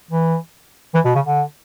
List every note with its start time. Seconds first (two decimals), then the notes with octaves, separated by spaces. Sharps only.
0.11 E3
0.94 E3
1.05 B2
1.15 C#3
1.26 D3